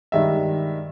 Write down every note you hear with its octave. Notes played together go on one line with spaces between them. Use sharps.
G2 D#3 G#3 E5